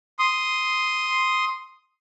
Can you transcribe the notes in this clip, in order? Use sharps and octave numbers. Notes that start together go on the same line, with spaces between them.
C6 D#6